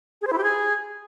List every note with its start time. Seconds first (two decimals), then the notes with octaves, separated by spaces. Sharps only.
0.22 G#4
0.27 C5
0.33 E4
0.38 G4
0.43 G#4